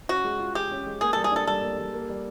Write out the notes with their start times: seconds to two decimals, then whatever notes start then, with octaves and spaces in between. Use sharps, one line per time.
0.09 C#4 F#4
0.24 G#3
0.39 F4
0.55 G4 G#4
0.71 C#4
0.86 G#3
1.01 A#3 G#4
1.13 G3 A4
1.24 G#4
1.32 D4 A4
1.47 G3 A4
1.62 A#3
1.78 G3
1.94 A#3
2.09 G3